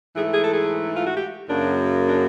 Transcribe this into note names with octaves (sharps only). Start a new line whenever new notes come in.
G#2 E3 A3 G#4
G#4
A4
G#4
F4
F#4
G4
F#2 C#3 F#3 A#3 D4
D4